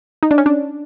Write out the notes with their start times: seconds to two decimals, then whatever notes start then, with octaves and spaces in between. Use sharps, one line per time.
0.23 D#4
0.31 D4
0.38 C#4
0.46 D4